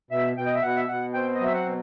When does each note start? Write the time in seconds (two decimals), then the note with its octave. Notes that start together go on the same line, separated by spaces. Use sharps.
0.11 B2 E5
0.37 B2 G5
0.46 D#5
0.55 E5
0.62 B2 F#5
0.76 E5
0.88 B2 F#5
1.14 C4 G5
1.35 D#5
1.41 F#3 E5
1.53 F#5
1.66 B2